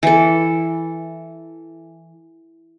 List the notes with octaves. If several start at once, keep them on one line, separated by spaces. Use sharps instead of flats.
E3 A4